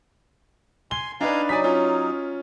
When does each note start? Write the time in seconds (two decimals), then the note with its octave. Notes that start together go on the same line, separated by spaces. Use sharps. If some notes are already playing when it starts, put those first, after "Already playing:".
0.91 G#5 C6 G7
1.21 D4 D#4 B4 F5 G#5 A#5
1.49 F#3 D#4 D5 G#5 B6
1.64 C#4 F4